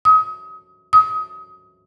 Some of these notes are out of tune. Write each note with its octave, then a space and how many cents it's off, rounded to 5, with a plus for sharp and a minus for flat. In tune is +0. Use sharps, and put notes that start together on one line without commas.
D#6 +30
D#6 +25